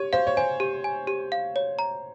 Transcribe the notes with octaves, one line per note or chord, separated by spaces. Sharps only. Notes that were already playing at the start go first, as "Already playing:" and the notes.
Already playing: G4 C#5
C5 F5
C#5
C5 G#5
G4
G#5
G4
F5
C#5
A#5